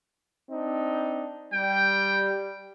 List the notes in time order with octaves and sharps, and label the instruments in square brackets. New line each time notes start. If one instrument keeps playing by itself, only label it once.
[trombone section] C4 D4 D#4
[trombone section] G3 [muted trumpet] G5